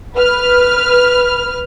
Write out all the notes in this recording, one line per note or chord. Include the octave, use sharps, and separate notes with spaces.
B4 F6